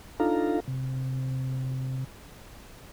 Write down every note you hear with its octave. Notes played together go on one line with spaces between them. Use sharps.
D4 D#4 F4 A4 F5 A#5
C3